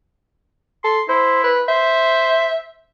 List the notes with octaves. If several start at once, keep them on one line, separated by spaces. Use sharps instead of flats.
A4 C6
E4 C5
B4
C5 E5